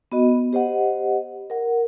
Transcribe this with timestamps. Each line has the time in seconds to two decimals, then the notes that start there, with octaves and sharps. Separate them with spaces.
0.12 B3 F#4 D#5
0.53 G4 C5 D#5 F#5
1.50 A#4 F#5